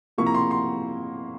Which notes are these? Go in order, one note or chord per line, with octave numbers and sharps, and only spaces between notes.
C3 F3 A#3 E4 C#6
A#5
C6
C6